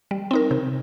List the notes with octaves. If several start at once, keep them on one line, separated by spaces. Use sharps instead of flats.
G3
C4 D#4 A#4
C3